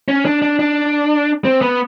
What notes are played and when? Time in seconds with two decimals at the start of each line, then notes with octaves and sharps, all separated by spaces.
0.08 C#4
0.25 D4
0.42 D4
0.59 D4
1.45 C4
1.61 B3